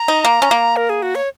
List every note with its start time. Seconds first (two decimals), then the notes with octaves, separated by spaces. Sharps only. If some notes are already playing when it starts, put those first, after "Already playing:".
Already playing: A#5
0.08 D#4
0.25 A#3
0.42 C#4
0.51 A#3
0.76 A#4
0.90 G#4
1.02 F#4
1.15 C#5